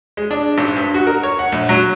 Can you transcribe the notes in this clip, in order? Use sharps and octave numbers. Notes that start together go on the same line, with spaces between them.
G#3
D4
G#1
G2
F#4
A#4
C#5
F#5
A#1
F#3